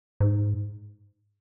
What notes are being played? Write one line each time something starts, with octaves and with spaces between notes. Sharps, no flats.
G#2